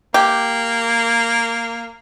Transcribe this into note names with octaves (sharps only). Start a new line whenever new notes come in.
A#3 G4